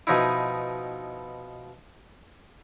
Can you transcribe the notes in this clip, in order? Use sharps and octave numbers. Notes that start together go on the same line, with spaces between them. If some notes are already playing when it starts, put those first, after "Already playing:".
B2 F3 D#4 E4